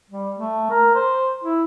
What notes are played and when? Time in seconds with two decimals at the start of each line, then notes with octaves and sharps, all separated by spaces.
0.10 G3
0.39 A3
0.70 A#4
0.95 C5
1.44 E4